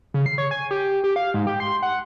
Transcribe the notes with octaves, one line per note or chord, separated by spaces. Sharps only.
C#3
C7
C#5
G#5
G4
G4
F5
G#2
G4
C6
F#5